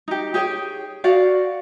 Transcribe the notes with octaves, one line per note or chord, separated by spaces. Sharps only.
D#4 G4
G4 G#4 C#5 G5
F#4 D5 F5 F#5